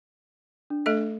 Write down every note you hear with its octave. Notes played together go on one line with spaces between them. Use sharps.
D4
A3 A4 D#5